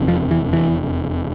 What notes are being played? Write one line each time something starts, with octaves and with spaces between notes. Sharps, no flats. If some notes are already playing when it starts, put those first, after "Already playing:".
Already playing: F1 E2 C3
F3
E3
E3